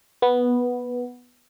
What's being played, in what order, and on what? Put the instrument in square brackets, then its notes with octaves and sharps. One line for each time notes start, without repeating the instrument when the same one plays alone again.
[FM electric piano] B3